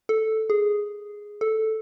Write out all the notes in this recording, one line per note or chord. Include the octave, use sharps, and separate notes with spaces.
A4
G#4
A4